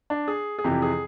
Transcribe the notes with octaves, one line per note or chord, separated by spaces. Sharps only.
D4
G#4
G#4
F2 C3 E3 G4
G#4